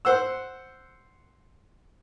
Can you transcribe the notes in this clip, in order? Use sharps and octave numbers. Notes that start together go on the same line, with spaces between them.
C5 F#5 E6